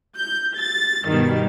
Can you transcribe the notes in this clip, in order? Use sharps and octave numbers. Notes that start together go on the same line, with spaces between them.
G6
A6
G2 B2 D#3 G3